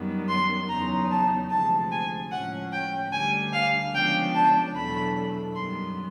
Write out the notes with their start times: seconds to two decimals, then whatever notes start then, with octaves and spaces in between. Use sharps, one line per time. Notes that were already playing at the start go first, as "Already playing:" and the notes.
Already playing: F#2 D#3 G3 B3
0.28 C6
0.68 E2 C#3 F#3 B3 D#4 A#5
1.10 A5
1.50 D2 C3 F3 G#3 A5
1.91 G#5
2.31 A2 F3 G#3 C#4 F#5
2.72 G5
3.12 D2 D3 G3 G#5
3.52 F5
3.94 C#3 F3 G#3 B3 D4 G5
4.34 A5
4.75 E2 B2 F#3 A3 D4 B5
5.55 F#2 D#3 G3 B3 C6